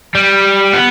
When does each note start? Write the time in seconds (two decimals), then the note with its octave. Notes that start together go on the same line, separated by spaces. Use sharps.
0.15 G3
0.73 B3